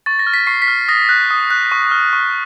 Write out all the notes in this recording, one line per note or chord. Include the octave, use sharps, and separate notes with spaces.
C#6 A6
A#6
F6
B6
C#6 C7
B6
F6
D#6 A#6
F#6
D#6
F#6
C#6
F6
C#6